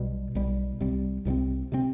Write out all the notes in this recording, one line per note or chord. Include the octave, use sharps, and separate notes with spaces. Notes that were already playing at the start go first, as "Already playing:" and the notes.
Already playing: B1 B2 G3
B1 B2 G3
C2 C3 G3 C4
C2 C3 G3 C4
C3 G3 C4